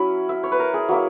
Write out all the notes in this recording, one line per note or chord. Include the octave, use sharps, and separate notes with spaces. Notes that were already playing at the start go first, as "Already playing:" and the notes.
Already playing: F#3 C#4 E4 B5
E5
C#5
B4
A#4
G#4
F#3 A#3 E4